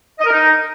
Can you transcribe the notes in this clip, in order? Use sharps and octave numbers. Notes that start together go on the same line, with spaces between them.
D#5
A#4
D#4